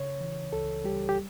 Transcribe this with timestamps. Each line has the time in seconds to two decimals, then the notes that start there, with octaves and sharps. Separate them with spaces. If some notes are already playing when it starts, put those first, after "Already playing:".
Already playing: C#3 C#5
0.21 E3
0.53 C#2 A4
0.84 G3 G4
1.09 G4